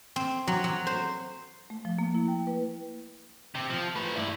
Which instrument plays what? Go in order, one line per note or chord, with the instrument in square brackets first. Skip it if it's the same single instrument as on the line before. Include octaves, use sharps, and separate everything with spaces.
[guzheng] C4
F#3
F#3
C5
[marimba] A3
F3
A#3
E4
G5
B4
[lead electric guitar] C3
F3
A3 B4
G2 E4